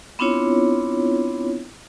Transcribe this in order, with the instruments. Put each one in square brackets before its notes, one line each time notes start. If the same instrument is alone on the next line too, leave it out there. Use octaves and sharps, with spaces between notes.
[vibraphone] B3 C4 D4 E4 F4 C#5